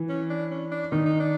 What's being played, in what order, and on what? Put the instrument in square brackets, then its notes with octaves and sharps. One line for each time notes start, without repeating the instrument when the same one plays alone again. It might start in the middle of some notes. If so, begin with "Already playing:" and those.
Already playing: [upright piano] E3
[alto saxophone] C#4
D4
C#4
D4
[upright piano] D#3 [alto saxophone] D#4
[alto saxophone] D#4
D4